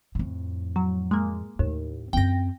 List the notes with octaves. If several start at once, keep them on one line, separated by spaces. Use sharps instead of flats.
F2 A2
F#3
G#3 A#3
D#2 A2
F#2 C4 G5 A#6